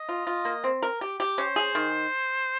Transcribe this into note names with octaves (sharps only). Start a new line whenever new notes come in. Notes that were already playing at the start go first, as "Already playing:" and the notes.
Already playing: D#5
F4
F4
A#3
C4
A#4
G4
G4
C#4 C5
G#4
D#3